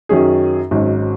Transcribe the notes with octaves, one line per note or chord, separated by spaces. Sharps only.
F#2 D#3 F#3 C#4 G#4
G#1 G#2 F#3 C#4